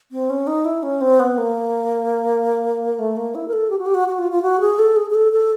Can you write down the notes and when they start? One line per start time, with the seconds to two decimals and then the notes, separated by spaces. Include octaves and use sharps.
0.12 C4
0.30 C#4
0.47 D#4
0.65 E4
0.83 C#4
1.01 C4
1.20 B3
1.38 A#3
2.99 A3
3.17 A#3
3.35 E4
3.48 A#4
3.53 A4
3.70 G4
3.79 F#4
3.86 G4
3.94 F#4
4.08 F#4
4.18 F4
4.32 F4
4.42 F#4
4.60 G#4
4.79 A4
4.96 G#4
5.10 G#4
5.15 A4
5.32 A4